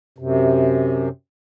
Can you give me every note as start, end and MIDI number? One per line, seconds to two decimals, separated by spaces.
0.18 1.09 42
0.18 1.09 48